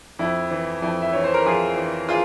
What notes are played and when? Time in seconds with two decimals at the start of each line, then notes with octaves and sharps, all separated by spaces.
0.19 F2 E4
0.51 E3
0.82 F2 E4
1.02 E5
1.13 E3 C#5
1.24 C5
1.34 A#4
1.46 F2 F4 G#4
1.77 E3
2.09 F4 G#4